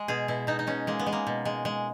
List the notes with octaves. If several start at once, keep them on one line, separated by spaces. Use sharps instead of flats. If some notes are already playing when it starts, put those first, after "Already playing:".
Already playing: G#3
B2 G#4
B2 E4
B2 D#4
D#4
B2 C#4
G#3 A#3
B3
G#3
A#3
B2
G#3
G#3